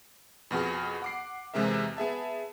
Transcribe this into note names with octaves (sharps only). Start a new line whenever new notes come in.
F2 B2 F#4 G#4
F#5 D6 C7
E2 C3 G#3 C4 A#4 E5
B3 G#4 E5 A5